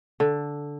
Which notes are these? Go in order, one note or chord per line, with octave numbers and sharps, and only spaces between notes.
D3